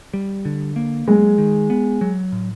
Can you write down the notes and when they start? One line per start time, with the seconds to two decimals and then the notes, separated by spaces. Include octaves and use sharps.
0.14 G3
0.45 D3
0.76 A#3
1.07 F#3 G#3
1.38 D#3
1.70 B3
2.01 F#3
2.32 A2